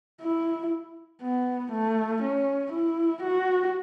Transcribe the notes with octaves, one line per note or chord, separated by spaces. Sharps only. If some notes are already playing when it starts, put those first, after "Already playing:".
E4
B3
A3
C#4
E4
F#4